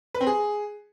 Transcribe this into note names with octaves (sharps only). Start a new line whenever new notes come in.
B4
C4
G#4